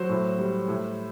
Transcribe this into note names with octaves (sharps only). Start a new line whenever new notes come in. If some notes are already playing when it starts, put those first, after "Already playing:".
Already playing: F#3 C5
A2
G3
A2